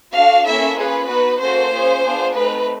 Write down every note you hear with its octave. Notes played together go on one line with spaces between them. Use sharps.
D4 F#4 A4 F5
A#3 C#4 E4 A4 E5
C#4 F4 G#4 B4
B3 D#4 F#4 B4
A#3 C#4 F#4 A4 C5
C#4 F4 G#4
B3 D4 F4 G#4
A3 C4 D#4 B4